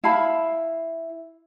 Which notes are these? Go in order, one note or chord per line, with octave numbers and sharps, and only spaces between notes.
E4 F5 A5 B5